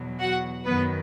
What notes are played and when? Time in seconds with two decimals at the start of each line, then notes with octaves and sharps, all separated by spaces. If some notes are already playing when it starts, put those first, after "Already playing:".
Already playing: E2 B2 F#3
0.19 F#4 F#5
0.65 F#2 D#3 F#3 B3 B4